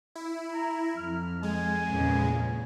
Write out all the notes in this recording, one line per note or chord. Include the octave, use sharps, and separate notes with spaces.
E4
A#5
F2 F6
G#3 G#5
E2 A#2 C#3